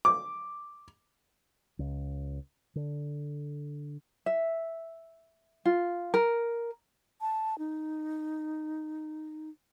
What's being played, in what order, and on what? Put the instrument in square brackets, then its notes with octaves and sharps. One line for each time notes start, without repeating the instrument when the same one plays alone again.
[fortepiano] D6
[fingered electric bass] C#2
D3
[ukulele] E5
F4
A#4
[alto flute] A5
D#4